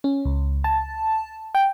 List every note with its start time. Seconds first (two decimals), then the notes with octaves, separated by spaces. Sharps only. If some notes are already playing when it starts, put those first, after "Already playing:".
0.04 C#4
0.25 C#2
0.64 A5
1.55 G5